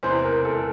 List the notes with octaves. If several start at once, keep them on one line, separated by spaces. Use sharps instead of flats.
E2 C3 E3 C5
A#4
A4